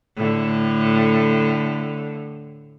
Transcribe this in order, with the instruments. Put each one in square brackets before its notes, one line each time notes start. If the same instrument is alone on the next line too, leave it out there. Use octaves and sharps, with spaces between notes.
[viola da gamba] A2 D3